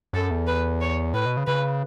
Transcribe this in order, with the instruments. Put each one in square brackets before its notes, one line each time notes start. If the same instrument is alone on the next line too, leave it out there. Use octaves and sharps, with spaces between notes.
[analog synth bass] F#2 [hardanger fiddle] A4
[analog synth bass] E2
[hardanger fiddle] B4
C#5
[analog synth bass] A2 [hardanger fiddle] B4
[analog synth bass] B2
C#3
[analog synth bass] C#3 [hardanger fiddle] B4